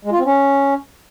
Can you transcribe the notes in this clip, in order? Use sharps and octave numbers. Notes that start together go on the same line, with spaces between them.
G#3
F4
C4
C#4